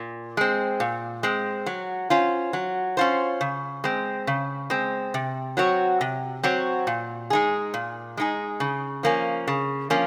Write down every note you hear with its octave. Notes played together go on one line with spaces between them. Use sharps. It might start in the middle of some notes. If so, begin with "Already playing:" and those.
Already playing: A#2
G#3 C4
A#2
G#3 C4
F#3
C#4 F4 C5
F#3
C#4 F4 C5
C#3
G#3 C4
C#3
G#3 C4
C3
F#3 C4 F#4 C#5
C3
F#3 C4 F#4 C#5
A#2
G#3 D#4 G#4
A#2
G#3 D#4 G#4
C#3
F3 A#3 C#4
C#3
F3 A#3 C#4